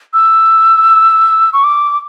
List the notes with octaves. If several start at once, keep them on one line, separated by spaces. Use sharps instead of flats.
E6
C#6
D6